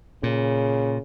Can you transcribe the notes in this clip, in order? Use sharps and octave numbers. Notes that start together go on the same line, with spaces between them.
A#2 C#3